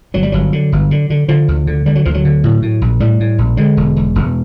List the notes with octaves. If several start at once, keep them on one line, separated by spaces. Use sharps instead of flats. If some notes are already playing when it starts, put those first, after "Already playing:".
G1 F#3
G3
G1 F#3
D3
G1
D3
D3
D3 F3
D2
D3
D3 G3
F#3
D2 F3
F#3
D3
A2
A2
A#1
A2 G3
A2
A#1
D3 G#3
E1
E1
E1